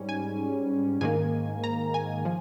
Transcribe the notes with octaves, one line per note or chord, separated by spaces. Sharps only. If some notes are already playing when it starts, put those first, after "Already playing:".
Already playing: G#2 G3 C#4
G#5
G#2 D#3 A#3 G#5
A#5
G#5
F3